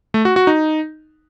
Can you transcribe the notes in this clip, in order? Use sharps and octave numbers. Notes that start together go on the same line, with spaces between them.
A3
F#4
F#4
D#4